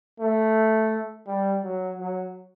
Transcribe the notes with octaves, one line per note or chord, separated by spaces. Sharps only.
A3
G3
F#3
F#3